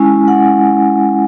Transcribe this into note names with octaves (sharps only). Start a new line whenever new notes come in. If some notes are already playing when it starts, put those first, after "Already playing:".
Already playing: G#3 C#4 E4 G#5
F#5